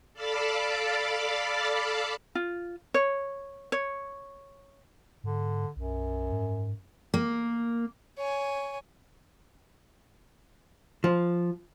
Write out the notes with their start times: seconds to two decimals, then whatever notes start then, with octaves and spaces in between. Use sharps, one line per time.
0.14 A4 D5 F5 A5 B5 D6
2.35 F4
2.94 C#5
3.72 C#5
5.24 G#2 D3
5.76 B1 F#2
6.32 G#2
7.14 A#3
8.18 C#5 G#5
11.04 F3